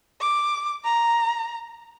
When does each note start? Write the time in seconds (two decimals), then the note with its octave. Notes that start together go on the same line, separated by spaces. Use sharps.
0.21 D6
0.85 A#5